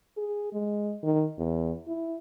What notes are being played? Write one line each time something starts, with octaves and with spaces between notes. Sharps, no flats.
G#4
G#3
D#3
E2
E4